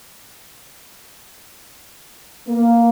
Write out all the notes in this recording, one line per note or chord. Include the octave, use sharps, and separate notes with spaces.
A#3